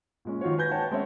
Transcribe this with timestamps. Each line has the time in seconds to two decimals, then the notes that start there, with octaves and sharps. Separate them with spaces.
0.25 A#2 G#3 C#4
0.41 D#3 F4 F#4 C#5
0.58 B4 G#5 G6 G#6 A#6
0.71 C#5 F#5 G5 A5
0.91 G#3 C4 C#4 C#5 E5